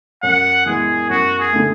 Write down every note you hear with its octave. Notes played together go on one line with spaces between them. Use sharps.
F#2 F#5
E3 G#3 B3 G#4
F#2 F#4
G#4
D3 A3